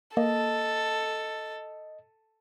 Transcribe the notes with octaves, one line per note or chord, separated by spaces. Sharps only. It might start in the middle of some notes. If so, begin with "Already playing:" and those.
A#3 A4 D#5